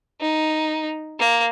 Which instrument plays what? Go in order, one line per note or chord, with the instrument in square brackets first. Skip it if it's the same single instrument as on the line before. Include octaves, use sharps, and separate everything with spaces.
[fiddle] D#4
A#3